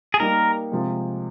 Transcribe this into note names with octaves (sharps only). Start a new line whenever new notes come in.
G#4
G3 A#3 D#4 A#4
C3 F3 G#3